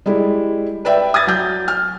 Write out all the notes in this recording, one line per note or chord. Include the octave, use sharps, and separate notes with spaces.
G3 G#3 E4
B4 D5 E5 G5
D#6 G#6 A6
F#3 G6
F6